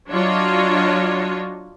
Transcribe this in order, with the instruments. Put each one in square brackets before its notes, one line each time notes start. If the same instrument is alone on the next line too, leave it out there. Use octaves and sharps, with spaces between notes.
[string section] F#3 D4 F4 F#4 C#5 D#5